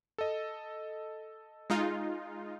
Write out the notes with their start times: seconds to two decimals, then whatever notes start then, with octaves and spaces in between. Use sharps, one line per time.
0.18 A4 D#5
1.70 G#3 D#4 F4